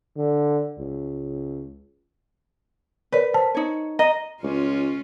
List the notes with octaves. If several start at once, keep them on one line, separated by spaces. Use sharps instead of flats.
D3
C#2
A#4 B4 C#5 D5
C5 A5
D#4 C#5
D#5 A#5
C#2 C#4 F4